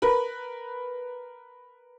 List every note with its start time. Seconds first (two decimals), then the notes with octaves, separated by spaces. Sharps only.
0.02 A#4 B4 B5